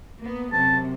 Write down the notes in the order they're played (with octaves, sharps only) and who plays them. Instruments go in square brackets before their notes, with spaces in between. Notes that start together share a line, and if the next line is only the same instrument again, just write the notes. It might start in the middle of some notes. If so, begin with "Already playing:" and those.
[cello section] A#3 B3
[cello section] F#2 C3 [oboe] A5